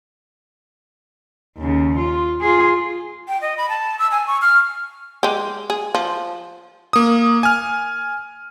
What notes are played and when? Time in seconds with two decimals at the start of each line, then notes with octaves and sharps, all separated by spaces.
1.57 D#2 C#3
1.98 F4
2.41 F4 G#4
3.28 G5
3.42 D#5
3.58 B5
3.69 A5
3.99 E6
4.11 G#5
4.27 C#6
4.42 F6
5.23 G#3 G4
5.70 G#4
5.95 F3
6.93 A#3 D#6
7.43 G#5 F6